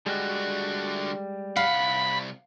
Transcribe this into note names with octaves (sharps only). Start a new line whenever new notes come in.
D3 G3 G#3 F#4
C2 F5 F#5 B5